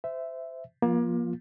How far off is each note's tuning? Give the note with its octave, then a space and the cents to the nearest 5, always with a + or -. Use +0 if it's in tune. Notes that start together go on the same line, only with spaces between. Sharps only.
C5 -25 E5 +0
F3 +0 A#3 +35 F4 +0